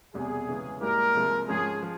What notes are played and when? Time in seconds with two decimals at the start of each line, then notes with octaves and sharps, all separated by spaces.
0.14 E1 E2 C3 G3 G#4
0.48 C#2 C#3 E3
0.81 G#2 G3 A#3 E4 G4 A#4
1.14 C2 C3 F3 G#3
1.48 G#2 F3 G#3 C#4 G#4
1.82 F3